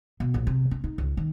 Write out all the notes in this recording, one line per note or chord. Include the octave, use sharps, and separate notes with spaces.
B2
A#1
C3
C#4
D#4
C#2
D#3